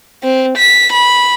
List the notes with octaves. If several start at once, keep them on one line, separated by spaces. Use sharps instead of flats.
C4
B6
B5